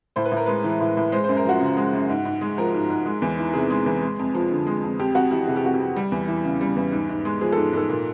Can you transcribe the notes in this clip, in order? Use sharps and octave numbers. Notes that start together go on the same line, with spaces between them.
A2 C5
B4
A2
A#4
G#3 B4
E3
A2
A2
G#3 C5
F#2 C5
A#4
F3 F#4
C#3
G#3
F#2
G#2
G#2
G#3
F3 A#4
G#2
G#2
G#3
E2
E3
C3 G#4
G#3
E2
G#3
F2
F3
D3
G#3
F2
F2 G4
F2 F#4
E3 G4
C3 G#4
G4
F2 F#4
G4
F2
G3
E2
E3
C#3
G3
E2
G#2
G#2
G#3
F3 G#4
G#2 A4
G#2 A4
A#2